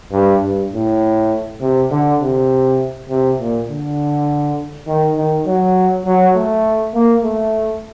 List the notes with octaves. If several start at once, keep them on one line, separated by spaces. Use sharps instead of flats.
G2
G2
A2
C3
D3
C3
C3
A#2
D3
D#3
D#3
F#3
F#3
A3
A#3
A3